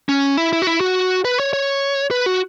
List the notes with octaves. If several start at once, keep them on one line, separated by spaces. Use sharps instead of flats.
C#4
E4
E4
F#4
E4
F#4
B4
C#5
C#5
B4
F#4